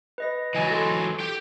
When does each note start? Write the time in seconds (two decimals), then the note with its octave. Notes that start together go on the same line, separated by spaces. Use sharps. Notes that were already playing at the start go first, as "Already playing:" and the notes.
0.18 B4 D#5 A#6
0.55 E3 F#3 D#5 G#5 A6
0.71 A4 C6
1.20 G4 G5